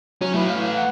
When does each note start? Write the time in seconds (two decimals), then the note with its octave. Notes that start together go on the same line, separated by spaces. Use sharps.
0.21 F#3 C#4
0.34 A3 E4 B4
0.50 F5
0.77 F#5